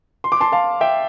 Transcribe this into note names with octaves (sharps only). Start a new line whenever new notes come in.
C6
D6
A5 C6
F5 A5
E5 G5